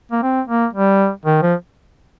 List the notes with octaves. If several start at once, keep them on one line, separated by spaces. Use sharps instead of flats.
A#3
C4
A#3
G3
D#3
F3